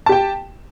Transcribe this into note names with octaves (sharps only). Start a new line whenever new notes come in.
G4 G5 A5